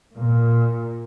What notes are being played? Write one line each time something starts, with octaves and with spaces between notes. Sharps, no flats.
A#2